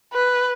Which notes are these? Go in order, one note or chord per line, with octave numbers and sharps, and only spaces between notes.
B4